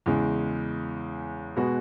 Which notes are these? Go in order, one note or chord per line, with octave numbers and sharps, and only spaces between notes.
E2 C#3 G#3
B2 G#3 B3 F#4